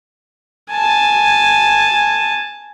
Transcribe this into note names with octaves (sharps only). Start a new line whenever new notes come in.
G#5 A5